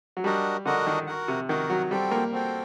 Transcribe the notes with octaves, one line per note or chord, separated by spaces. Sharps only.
F#3
G3 D4 F#4 A#4 D#5 F#5
D3 D4 F#4 A#4 D#5 F#5
D#3
F#4 A#4 F#5
C3
D#3 F#4 A#4 F#5
F#3
G3 C4 F#4 A4 C5 G5
A#3
C4 F#4 A4 C5 G5